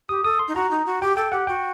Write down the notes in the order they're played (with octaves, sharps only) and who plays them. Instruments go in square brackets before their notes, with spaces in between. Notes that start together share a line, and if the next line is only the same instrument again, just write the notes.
[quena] G4 [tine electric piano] D#6
[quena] A4 [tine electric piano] D#6
[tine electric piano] C6
[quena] D#4
[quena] F#4 [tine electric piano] A#5
[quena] D#4
F#4
[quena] G4 [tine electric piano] G5
[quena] A4 [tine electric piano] G5
[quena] G4 [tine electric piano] F#5
[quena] F#4 [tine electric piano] G5